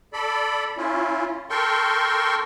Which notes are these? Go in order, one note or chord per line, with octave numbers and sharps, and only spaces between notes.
A4 D5 B5
C#4 E4 F4
A4 A#4 G5 C6 C#6